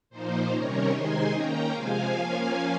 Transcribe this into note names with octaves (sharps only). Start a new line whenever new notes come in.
A#2 F3 A#3 D#4 C5
C3 D#3 G3 C#4 A#4 C#5
C3 D#3 G#3 C4 D#4 G#5 C6
D#3 A#3 C#4 G5 A#5
C3 F3 G#3 C4 F5 G#5
F3 A#3 C#4 F5 G#5